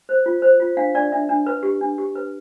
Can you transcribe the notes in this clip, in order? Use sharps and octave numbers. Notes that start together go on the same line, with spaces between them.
C5
F4
C5
F4
D4 F5
D4 D5
D4 E5
D4
B4
G4
D4
G4
B4